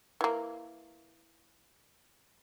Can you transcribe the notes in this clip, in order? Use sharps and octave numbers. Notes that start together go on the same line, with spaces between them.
E3 A#3